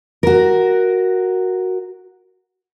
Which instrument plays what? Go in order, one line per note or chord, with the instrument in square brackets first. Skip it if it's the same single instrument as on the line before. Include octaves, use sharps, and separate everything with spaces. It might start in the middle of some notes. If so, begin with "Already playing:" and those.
[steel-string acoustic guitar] F#4 A#4